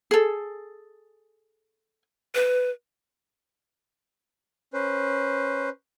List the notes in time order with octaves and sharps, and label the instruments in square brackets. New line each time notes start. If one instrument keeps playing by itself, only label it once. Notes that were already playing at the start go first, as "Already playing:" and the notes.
[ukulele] G#4 A4
[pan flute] B4
[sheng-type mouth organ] C#4 B4 C5